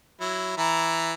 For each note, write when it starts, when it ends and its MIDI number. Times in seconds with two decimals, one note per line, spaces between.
0.20 0.55 54
0.20 0.55 64
0.57 1.14 52
0.57 1.14 64
0.57 1.14 82